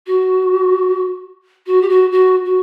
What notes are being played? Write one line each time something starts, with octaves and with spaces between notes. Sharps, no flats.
F#4
F#4
G4
F#4
F#4
F#4